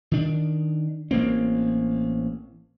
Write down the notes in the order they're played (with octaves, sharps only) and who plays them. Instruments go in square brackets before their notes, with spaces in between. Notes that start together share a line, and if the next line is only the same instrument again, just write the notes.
[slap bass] D#3 D4
A1 A#3 C4